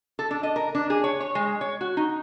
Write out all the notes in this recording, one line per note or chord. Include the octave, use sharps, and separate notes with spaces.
A4
D4
D#5
A#4
D4
G#4
C#5
C#5
G#3
C#5
F#4
D#4